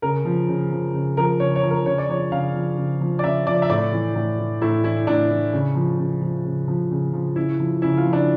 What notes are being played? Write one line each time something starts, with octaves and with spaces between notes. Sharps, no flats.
C#3 A#4
F3
C#3
F3
C#3
F3 A#4
C#3 C#5
C#5
F3
A#4
C#3 C#5
D5
F3 C#5
C#3 F5
F3
C#3
F3
D5
C#3 E5
F3 D5
E5
A2 D5
E3
A2
E3
A2 E4
E3 E4
A2 D4
E3
C#3
F3
C#3
F3
C#3
F3
C#3
F3
C#3 E4
F3
C#3 E4
F4
F3
D4